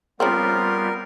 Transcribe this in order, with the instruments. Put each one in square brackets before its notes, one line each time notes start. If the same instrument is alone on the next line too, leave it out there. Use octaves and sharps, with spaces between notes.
[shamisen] C#3 F3 C4 [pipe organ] G3 B3 F4 [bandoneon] A#4